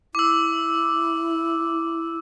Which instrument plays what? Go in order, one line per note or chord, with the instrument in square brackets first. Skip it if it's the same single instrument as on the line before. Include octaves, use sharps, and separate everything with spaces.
[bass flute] E4 [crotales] D6 E6